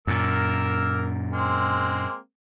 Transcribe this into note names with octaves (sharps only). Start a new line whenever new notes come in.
F#2 A#2 A#3 A#4 E6
G#3 A#3 C4